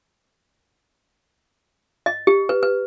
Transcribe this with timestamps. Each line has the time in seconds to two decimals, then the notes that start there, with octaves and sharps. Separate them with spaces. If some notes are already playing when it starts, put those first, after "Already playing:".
2.06 D#5
2.27 G4
2.49 B4
2.63 B4